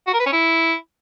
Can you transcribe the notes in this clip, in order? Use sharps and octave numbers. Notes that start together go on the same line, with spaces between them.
F#4
A#4
B4
C#4
E4